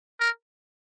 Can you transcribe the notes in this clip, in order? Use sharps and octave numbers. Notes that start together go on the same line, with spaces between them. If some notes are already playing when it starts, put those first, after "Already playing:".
A#4